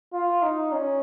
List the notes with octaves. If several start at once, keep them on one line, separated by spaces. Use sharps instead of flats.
F4
D#4
C#4